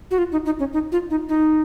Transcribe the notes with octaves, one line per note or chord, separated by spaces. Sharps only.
F#4
F4
D#4
D#4
C#4
D#4
F4
D#4
D#4